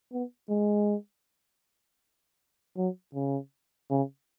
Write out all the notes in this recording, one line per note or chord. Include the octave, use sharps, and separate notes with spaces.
B3
G#3
F#3
C#3
C#3